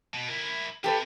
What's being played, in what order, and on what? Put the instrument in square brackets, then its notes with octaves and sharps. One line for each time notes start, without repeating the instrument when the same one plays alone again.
[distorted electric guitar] B2
E4 A#4
[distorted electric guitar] C3 [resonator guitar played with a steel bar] G4 A4 B4